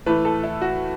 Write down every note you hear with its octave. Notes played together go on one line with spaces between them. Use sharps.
A2 E3 A3 B4
A4
E4
F#4